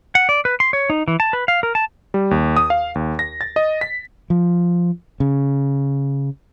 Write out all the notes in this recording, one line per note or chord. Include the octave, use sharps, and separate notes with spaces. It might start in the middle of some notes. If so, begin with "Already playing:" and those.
F#5
D5
B4
C6
C#5
D#4
E3
A5
B4
F5
A#4
A5
G3
D#2
D#6
F5
D#2
A#6
A6
D#5
B6
F3
C#3